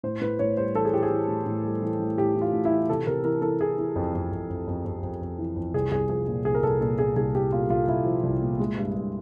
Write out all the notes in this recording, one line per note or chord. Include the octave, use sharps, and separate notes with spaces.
A2 C5
A2 B4
A2 C#5
G3 C5
E3 A4
G#4
A2 G4
G#4
E3
A2
A2
G3
E3
A2
A2 G4
E3
F4
A2
E4
E3
C3 A4
C3 A#4
E3 A#4
E3 A4
E3 G#4
E3
F2
F2
F2
F2
F2
F2
F2
F2
E3
F2
C2 G#4
C2 G#4
F3 G#4
A#2
C2 G#4
A#4
C2 A4
A#2 A4
A#2 G#4
C2 G#4
C2 G4
A#2 F4
C2 F4
C2 E4
F3
C2
A#2
G#3
G2
G2